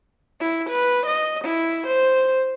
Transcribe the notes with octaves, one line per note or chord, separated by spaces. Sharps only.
E4
B4
D#5
E4
C5